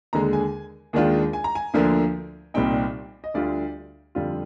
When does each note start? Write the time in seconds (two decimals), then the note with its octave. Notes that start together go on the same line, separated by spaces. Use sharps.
0.13 D#2 D3 G#3 A#5
0.33 G#5
0.93 D#2 D#3 G#3 D4 F4
1.33 G#5
1.44 A#5
1.55 G#5
1.74 D2 D3 F3 A#3 D4
2.54 C2 A#2 G3 C4 D#4 G5
3.24 D#5
3.34 D2 D3 G3 D4 F4 D5
4.15 F2 D3 G3 C4 F4